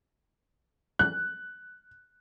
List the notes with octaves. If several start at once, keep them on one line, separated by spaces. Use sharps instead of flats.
F#6